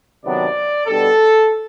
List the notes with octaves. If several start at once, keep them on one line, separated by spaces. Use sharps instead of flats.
C3 D#3 F#3 B3 D4 D5
B2 G3 B3 D4 A4